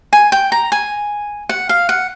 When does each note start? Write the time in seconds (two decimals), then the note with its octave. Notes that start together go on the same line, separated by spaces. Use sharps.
0.13 G#5
0.32 G5
0.52 A#5
0.72 G#5
1.49 F#5
1.69 F5
1.89 F#5